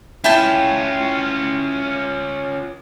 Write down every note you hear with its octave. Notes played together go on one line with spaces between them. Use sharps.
C#4 E4 F4 G5 A5